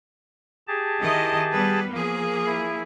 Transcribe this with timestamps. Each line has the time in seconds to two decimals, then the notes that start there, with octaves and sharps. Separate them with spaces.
0.68 G4 G#4 A5
1.00 D#3 E4 D#5
1.52 G3 B3 B4
1.92 F3 A#3 G#4
2.46 E4